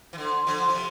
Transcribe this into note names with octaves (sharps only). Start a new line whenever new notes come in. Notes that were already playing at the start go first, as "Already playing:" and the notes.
E3
D3
D3 F3
F3
C3